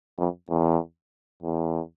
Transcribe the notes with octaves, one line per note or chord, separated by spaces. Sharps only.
F2
E2
E2